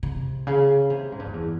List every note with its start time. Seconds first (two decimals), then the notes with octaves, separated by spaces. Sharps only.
0.03 C3
0.47 C#3
0.90 C3
1.12 G#2
1.19 G2
1.27 F2
1.33 E2